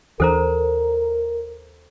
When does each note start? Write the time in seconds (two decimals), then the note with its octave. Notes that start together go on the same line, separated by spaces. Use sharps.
0.20 D#2 E3 D4 A4 A#4 C5 A#5